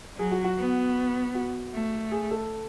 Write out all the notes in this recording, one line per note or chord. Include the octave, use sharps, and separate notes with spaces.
F#3 G#4
F#4
F#4
B3
F#4
A3
G#4
A4